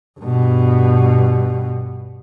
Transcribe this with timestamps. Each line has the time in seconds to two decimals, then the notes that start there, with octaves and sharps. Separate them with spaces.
0.20 G2 B2